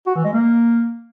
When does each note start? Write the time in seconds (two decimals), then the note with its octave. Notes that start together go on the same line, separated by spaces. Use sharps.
0.07 F#4
0.15 E3
0.24 G#3
0.33 A#3